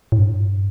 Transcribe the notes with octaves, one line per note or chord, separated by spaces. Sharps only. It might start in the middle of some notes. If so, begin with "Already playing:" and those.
A2
G2